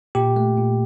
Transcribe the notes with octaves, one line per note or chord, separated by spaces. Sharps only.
A#2 G4
A3
A#2